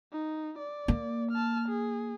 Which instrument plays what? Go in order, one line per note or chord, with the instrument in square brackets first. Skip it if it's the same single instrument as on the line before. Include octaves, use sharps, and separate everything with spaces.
[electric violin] D#4
D5
[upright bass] A#3
[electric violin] A5 F6
G#4